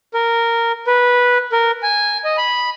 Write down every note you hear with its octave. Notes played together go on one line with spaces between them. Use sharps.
A#4
B4
A#4
G#5
D#5
B5